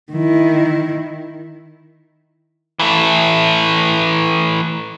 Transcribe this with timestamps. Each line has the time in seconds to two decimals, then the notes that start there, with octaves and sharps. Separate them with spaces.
0.13 D#3 E4
2.79 E3 A3